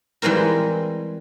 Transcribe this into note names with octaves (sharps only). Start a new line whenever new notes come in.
E3 G3 G#3 C4 A#4